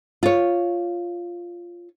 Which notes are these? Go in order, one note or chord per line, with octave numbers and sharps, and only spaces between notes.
F4 C#5